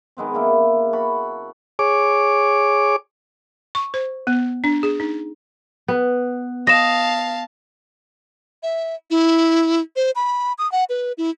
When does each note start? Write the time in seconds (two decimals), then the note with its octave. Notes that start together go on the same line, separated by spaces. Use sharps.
0.17 D#3 G#3 B3 C4
0.33 C#3 A#3 E4
0.93 F#4 A5 B5
1.79 G#4 C#5 D6
3.75 C#6
3.94 C5
4.27 B3
4.64 D4
4.83 G#4
5.00 D#4
5.88 B3
6.67 D#5 F5 A5 A#6 E7
8.63 E5
9.10 E4
9.96 C5
10.16 B5
10.58 D#6
10.72 F#5
10.89 B4
11.18 E4